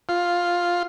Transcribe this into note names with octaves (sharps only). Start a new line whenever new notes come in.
F4